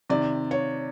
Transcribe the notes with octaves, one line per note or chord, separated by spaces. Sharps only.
C3 D#3 D5
C#5